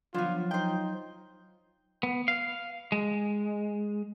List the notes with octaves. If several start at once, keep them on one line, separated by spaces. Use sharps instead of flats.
D3 F3 F#3 B3 F4
D#4 C5 G5
B3
F5
G#3